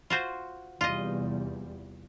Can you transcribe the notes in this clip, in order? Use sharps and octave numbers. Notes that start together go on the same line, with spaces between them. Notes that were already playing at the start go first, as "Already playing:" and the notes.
F4 F#4 C5
E2 C3 G3 F4 D#5